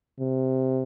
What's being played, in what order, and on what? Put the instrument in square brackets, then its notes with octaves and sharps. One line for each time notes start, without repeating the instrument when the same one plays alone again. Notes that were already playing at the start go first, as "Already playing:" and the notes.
[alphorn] C3